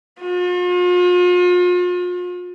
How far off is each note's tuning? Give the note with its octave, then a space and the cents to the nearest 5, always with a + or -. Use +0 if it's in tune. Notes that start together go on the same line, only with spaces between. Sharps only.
F4 +40